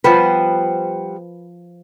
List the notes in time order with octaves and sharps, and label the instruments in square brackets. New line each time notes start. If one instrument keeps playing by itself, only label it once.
[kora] F3 B4 [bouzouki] G3 B3 C5